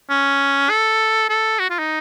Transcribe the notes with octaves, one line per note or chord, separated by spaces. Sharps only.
C#4
A4
A4
F#4
F4
D#4